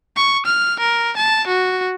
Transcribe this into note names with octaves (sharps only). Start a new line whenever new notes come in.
C#6
F6
A#4
A5
F#4